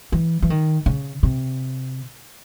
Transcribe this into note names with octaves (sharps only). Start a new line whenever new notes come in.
E3
E3
D#3
C#3
C3